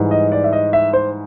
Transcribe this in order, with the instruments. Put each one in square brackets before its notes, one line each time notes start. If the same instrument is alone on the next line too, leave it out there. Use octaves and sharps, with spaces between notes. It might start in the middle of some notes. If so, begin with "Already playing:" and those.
Already playing: [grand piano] G#2 E3 G3
D#5
D5
E5
D#5
E5
C5